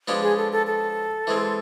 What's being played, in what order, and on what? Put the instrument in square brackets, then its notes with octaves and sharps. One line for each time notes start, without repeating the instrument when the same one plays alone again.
[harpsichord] F3 G#3 B3 D4 G4
[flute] G#4
A4
A4
A4
[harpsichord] E3 G#3 C4